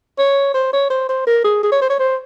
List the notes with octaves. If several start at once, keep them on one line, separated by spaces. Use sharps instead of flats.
C#5
C5
C#5
C5
C5
A#4
G#4
G#4
C#5
C5
C#5
C5